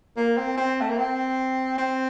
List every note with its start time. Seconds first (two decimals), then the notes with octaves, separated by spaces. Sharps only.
0.17 A#3
0.37 C4
0.57 C4
0.81 A3
0.89 A#3
0.98 C4
1.78 C4